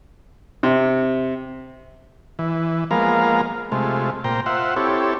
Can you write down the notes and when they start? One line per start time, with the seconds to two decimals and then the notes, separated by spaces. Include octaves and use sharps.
0.63 C3
2.39 E3
2.91 F3 G#3 A#3 B3 A#4 F5
3.72 C3 G#3 A3 F4
4.24 A#2 C5 G5 A#5
4.46 F4 C5 E5 F#5
4.76 C4 E4 G4 A4 C#5